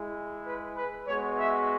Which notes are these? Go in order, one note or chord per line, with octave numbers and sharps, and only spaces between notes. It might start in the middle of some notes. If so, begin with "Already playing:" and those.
Already playing: G#3 E4
B4
B4
G#3 B3 F#4 C#5
E5